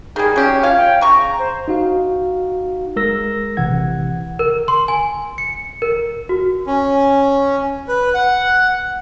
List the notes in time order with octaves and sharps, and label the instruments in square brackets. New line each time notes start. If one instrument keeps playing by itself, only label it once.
[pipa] D#3 G3 [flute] G#4
[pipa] F#3 G4 [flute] C#4
[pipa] F4 F5 [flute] C#5
[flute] G5
[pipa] C#3 C#6 [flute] A#5
[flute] C5
[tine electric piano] D#4 F#4 F5
G#3 A#4 E6 A#6
A1 C3 E3 F#5 G#6
[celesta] A#4
C6
G#5
C#7
A#4
F#4
[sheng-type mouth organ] C#4
B4
F#5